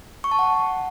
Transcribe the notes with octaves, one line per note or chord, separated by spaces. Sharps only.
C#6
A5
F#5